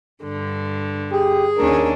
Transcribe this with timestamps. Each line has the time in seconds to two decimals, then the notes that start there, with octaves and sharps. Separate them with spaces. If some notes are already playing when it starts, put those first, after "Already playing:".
0.23 G2 D3
1.12 G4 G#4
1.57 D#2 C#4 D4 A#4